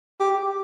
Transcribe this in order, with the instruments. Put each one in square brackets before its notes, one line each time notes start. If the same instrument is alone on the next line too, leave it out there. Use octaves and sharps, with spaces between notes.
[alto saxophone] G4